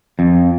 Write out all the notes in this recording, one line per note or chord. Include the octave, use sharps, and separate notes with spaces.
F2